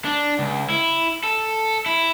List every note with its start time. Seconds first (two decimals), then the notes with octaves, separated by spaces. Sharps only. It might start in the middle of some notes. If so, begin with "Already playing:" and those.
0.05 D4
0.39 C#2
0.70 E4
1.24 A4
1.86 E4